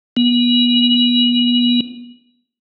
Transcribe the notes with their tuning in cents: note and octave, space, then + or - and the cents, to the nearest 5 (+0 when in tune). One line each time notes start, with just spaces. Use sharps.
B3 -30